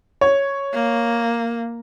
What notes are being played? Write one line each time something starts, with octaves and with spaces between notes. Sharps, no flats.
C#5
A#3